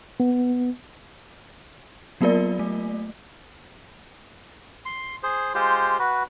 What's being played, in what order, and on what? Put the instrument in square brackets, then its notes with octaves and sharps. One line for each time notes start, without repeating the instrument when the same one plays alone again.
[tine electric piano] B3
[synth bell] F#3 A#3 B3 F4 A#4 D5
A3
[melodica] C6
G#4 C5
G#3 F4 G4 C5
F#4 B4